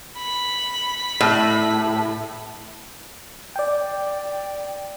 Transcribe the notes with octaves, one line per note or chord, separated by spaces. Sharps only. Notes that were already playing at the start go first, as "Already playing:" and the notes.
B5
A2
D5 G5